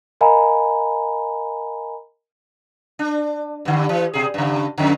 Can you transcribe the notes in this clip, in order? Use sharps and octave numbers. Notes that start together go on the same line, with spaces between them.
A#4 D#5 F5 G#5 A#5 B5
D4
G2 D3
E3
B2 G#4
G2 C#3
F2 D3